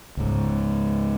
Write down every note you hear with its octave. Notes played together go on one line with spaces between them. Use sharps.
C#2 G#2